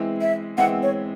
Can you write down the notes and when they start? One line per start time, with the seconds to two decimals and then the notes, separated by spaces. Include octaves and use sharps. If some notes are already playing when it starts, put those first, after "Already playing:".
Already playing: E3 G#3 C4 E4
0.21 E5
0.58 E3 G#3 C4 E4 F#5
0.83 C#5